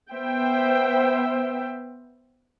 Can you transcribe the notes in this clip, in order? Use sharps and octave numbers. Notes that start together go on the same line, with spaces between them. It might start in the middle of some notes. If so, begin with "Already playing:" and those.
B3 C5 E5 G5